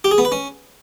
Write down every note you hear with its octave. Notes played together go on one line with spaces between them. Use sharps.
G4
G#4
B3
B4
C#4